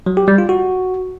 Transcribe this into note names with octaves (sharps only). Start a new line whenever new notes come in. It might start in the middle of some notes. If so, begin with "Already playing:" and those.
F#3
G4
G3
F4
F#4